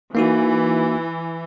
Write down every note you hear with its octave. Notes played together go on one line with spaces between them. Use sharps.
E3 A#3 D#4 F#4